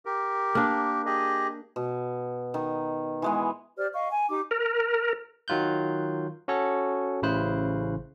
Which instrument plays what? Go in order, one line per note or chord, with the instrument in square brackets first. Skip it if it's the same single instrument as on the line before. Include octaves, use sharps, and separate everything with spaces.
[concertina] G4 A#4
[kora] A#3 D4
[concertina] G4 G#4 D#5
[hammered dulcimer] B2
D#3
E3 G#3 B3
[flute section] G4 C5 D5 F6
D#5 F5 C#6
G#5
D#4 G4 D6
[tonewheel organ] A#4
[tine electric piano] D#3 F#3 F4 F#6 G6
C#4 F#4 A4 C#5
A1 C#3 E4 C5 F#6